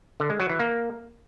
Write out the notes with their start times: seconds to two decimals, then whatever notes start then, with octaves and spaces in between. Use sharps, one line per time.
0.20 D3
0.30 G#3
0.40 F#3
0.49 E3
0.59 A#3